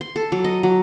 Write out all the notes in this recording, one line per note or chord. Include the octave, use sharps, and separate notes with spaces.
C6
A4
F#3
D#5
F#3